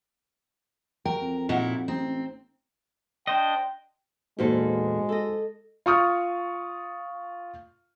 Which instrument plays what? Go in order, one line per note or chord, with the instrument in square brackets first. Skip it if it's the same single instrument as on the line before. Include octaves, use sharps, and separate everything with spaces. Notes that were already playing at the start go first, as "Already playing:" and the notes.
[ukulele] F#4 G5 [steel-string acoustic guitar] A#4
[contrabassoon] F2
[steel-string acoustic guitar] A#2 D#4 E4 [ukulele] F#4 F#5
[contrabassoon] A1 [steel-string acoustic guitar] C4 [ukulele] D#4
[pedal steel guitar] D4 C5 D#5 [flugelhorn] G5
[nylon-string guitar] E2 A#2 A4 [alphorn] G#3 [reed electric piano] D#4 F#4 C5
[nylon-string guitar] A4 D#5
[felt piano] F4 C#6 D#6 F6